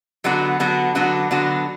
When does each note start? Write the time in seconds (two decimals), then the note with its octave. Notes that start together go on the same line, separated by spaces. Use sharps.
0.24 D3 F#3 B3 D4 F#4
0.60 D3 F#3 B3 D4 F#4
0.95 D3 F#3 B3 D4 F#4
1.31 D3 F#3 B3 D4 F#4